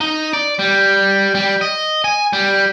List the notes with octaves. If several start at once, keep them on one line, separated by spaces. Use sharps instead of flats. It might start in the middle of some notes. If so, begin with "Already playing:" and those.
D#4
D5
G3
G3
D#5
G#5
G3